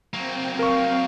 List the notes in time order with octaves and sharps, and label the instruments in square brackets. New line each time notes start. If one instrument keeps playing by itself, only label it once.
[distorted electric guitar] F#3 A#3 [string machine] C4 G5
[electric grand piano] A#4 C#6 [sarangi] F5